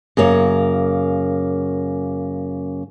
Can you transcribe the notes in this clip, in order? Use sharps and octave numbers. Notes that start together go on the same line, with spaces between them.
F#2 C#3 A#3 C#5